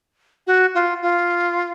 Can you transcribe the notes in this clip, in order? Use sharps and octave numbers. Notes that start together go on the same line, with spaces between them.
F#4
F4
F4